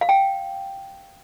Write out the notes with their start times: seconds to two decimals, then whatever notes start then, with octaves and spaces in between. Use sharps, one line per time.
0.01 F5
0.09 G5